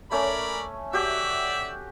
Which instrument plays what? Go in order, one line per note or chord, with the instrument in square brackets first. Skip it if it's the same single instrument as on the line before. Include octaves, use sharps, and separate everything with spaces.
[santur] A3 C#4 [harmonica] A#4 D5 B5
[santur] F#4 G4 G5 [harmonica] D5 E5